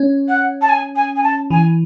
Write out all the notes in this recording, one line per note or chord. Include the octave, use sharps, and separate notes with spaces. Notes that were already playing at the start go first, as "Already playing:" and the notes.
Already playing: C#4
F#5
A5
G#5
G#5
G#5
A5
E3 G#5